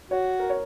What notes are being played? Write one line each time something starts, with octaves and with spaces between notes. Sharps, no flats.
F#4 C#5
A#4
C#5